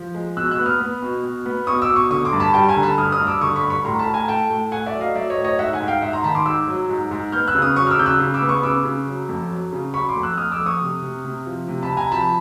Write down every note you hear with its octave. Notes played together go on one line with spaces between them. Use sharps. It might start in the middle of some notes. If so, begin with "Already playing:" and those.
Already playing: F3
G#3
B2 E6 F#6
E6 F#6
B3
D#6 F6
B3
B2
B2
B3
B2 C#6 D#6
D6 E6
B2
C#6 D#6
D3 C#6 D#6
C6 D6
G2
A5 B5
G3 G5 A5
G#5 A#5
D3
A5 B5
G2 D#6 F6
D#6 F6
G2
D6 E6
D3 C#6 D#6
B5 C#6
G2
B5 C#6
A2 A#5 C6
A5 B5
A2
G#5 A#5
A3 G5 A5
A2
A3 F#5 G#5
D5 E5
F#3
D#5 F5
F#3 D5 E5
C#5 D#5
A2
C#5 D#5
G#2 E5 F#5
F#5 G#5
G#2
F5 G5
G#2 E5 F#5
A#5 C6
D#3 A5 B5
C6 D6
G#2 D6 E6
F#3
G#2
G#2
B3 F6 G6
E6 F#6
C#3
D#6 F6
F#3 C#6 D#6
F6
D6 E6
C#3 G6
E6 F#6
C#3
D6 E6
B3
C#6 D#6
C#3 D6 E6
C#3
F#3
F2
F#3
C#3
F#3 B5 C#6
C6 D6
F2
E6 F#6
F2 D#6 F6
D6 E6
F2
C#6 D#6
C3
C3
C3
F3
C3
A5 B5
C3
G#5 A#5
F3 A5 B5